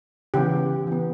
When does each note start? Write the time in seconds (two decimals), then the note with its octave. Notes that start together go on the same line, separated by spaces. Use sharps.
0.34 C#3 E3 B3 G4
0.87 E3 B3